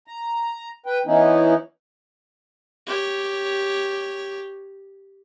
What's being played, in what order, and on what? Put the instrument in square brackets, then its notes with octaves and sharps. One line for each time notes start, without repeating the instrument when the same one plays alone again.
[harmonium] A#5
B4 G5
E3 B3 C#4 D#4 E4
[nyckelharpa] G4 C#5